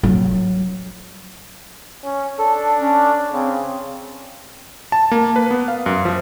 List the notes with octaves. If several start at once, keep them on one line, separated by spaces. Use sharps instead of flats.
F#3
C#4
D4 A4
C#4
C#3 C4
A5
A#3
B4
B3
F5
F#2
F3